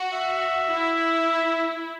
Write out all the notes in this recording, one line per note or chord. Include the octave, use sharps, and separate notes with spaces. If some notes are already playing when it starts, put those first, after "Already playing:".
Already playing: F#4
E5
E4